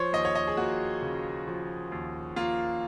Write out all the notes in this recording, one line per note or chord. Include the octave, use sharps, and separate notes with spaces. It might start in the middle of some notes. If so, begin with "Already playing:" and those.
Already playing: F3 C5 C#5
D#2 D#5
C#5
D#5
G#4
A#3 F#4
C#3
F3
D#2
A#3 F4